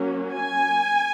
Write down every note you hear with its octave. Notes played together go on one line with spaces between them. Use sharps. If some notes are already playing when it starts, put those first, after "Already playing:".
Already playing: F#3 A#3 C#4
G#5